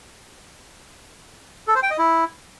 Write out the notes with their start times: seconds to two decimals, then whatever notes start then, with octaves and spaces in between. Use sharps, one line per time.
1.68 A4
1.75 C5
1.83 G5
1.90 D#5
1.98 E4